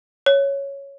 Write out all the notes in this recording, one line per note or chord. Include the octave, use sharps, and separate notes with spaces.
C#5